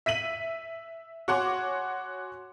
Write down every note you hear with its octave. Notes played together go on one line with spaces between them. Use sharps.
E5 B6 D#7 F#7
F#4 C#5 F#5 G#5 C6 D6